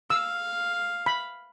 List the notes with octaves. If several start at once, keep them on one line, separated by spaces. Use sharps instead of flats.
F5 E6
B5